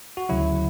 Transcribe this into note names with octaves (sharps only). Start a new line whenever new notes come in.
F#4
D2 C#3 F#3 E4